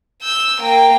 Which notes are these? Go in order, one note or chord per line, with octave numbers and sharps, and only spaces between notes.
E6 G6
A#3 G5